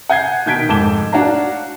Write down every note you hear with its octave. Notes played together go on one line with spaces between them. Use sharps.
F#5 G#5 G6 G#6 C7
B2 D#3 G6 G#6 B6 D7
F1 G#2 A5 D6 E7 G7
D4 F#4 C#5 F5 A5 A#5